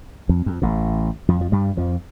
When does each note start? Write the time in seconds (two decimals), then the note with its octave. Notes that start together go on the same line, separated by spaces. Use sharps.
0.29 F2
0.46 F2
0.62 A1 A2
1.28 F2 F3
1.41 F3
1.52 G2 G3
1.77 F2 F3